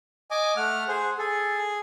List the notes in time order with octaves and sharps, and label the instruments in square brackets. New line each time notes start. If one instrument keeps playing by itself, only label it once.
[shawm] D#5 [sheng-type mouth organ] G#5 D6
[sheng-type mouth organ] A3 F6 [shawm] F#5
[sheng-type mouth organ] G#4 C5
[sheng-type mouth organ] G#4 [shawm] A4